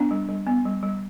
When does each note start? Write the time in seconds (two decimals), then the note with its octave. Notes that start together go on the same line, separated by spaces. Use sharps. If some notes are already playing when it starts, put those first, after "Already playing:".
Already playing: B3 D4
0.11 G3
0.29 G3
0.47 B3
0.65 G3
0.83 G3